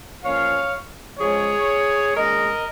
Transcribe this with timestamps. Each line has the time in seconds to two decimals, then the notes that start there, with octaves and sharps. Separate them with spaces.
0.23 A#2 F3 C#4 C#5 F5
1.19 C#3 F3 G#3 C#4 G#4 C#5
2.15 A#2 G#3 C#4 A#4 D#5